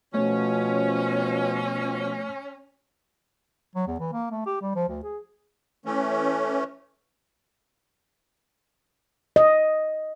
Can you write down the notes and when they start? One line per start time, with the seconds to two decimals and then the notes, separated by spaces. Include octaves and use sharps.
0.14 B2 F3 A3 C#4 C#5
3.76 F#3
3.87 E2
4.00 E3
4.13 A#3
4.32 A3
4.46 G4
4.61 G3
4.76 F3
4.89 D2
5.03 G#4
5.86 E3 A3 C#4
9.36 D#5